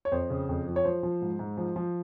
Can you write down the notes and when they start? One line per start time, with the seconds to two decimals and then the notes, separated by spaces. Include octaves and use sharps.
0.05 C#5
0.12 F2 C5
0.30 C#3
0.49 F2
0.67 F3
0.76 C#5
0.84 F3 C5
1.03 F3
1.21 G#2
1.39 G#2
1.57 F3
1.76 F3